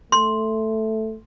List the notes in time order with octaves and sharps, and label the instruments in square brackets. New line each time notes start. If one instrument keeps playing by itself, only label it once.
[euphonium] A3 [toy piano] C6